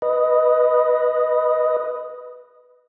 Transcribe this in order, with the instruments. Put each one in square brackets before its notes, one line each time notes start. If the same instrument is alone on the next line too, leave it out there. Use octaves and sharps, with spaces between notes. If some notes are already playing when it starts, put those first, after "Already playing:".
[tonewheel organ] B4 D#5